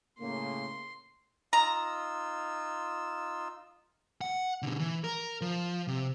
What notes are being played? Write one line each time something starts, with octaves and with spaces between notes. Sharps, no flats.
A2 C#3 A#3 C6
D#4 F4 A#5 E6
F#5
B2 D3
E3
A#4
F3
C3